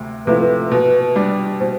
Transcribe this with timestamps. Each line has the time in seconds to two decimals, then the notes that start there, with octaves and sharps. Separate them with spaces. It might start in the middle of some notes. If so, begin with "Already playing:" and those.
Already playing: D2 C3
0.27 C3 F3 A3 E4 B4
0.71 B2 B4
1.16 G3 D4
1.60 B2 C5